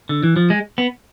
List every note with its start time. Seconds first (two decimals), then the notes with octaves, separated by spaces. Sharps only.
0.09 D3
0.23 E3
0.36 F3
0.50 G#3
0.78 B3